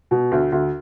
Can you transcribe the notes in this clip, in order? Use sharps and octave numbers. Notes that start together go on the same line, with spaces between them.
B2
D2
D2